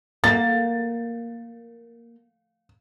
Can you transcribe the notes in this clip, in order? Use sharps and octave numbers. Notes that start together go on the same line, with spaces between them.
A#3 A6